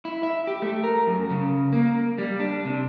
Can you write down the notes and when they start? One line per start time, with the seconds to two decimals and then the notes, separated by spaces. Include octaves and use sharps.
0.05 E4
0.23 E5
0.47 G4
0.62 A3
0.84 A#4
1.07 F#2
1.30 C#3
1.73 A#3
2.18 G3
2.40 D4
2.65 C3